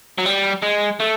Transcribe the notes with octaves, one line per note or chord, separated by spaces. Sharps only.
F#3
G3
G#3
A3